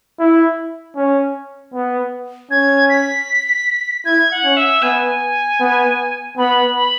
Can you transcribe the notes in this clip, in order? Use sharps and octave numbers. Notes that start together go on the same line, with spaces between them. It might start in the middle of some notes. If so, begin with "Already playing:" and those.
E4
C#4
B3
C#4 G#6
B6
E4 G#6
F#5
C#4
E5
B3 G#5
B3
B3 B5
B5